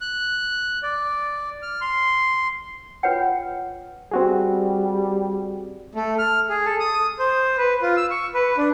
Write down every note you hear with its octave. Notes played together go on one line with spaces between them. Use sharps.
F#6
D5
F6
C6
F4 B4 C#5 F#5 G5
G3 C4 F#4 G#4
A3
F6
G#4
A4
D#6
C5
B4
F4
E6
C#6
B4
D4